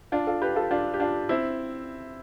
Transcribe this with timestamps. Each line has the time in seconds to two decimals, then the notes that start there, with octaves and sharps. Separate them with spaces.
0.12 D4 F4
0.27 F4 A4
0.42 G4 B4
0.56 F4 A4
0.71 D4 F4
0.94 G4
1.00 D4 F4
1.29 C4 E4